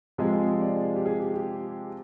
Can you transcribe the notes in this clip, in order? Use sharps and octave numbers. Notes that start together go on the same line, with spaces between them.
C3 F3 G#3 G#4
G#4
D5
G4
G#4
G4
G4